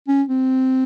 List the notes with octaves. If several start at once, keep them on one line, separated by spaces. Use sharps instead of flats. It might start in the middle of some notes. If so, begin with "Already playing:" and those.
C#4
C4